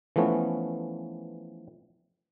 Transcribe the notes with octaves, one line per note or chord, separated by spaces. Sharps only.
E3 F3 A3 B3 C#4